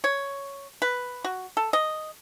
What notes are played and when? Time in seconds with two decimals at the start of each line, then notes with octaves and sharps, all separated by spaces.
0.04 C#5
0.82 B4
1.24 F#4
1.57 A4
1.73 D#5